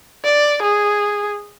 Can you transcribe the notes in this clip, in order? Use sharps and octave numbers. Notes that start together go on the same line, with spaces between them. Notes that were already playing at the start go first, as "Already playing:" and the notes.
D5
G#4